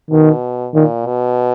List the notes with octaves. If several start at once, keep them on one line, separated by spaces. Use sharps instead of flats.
B2 D#3
A#2 D#3
B2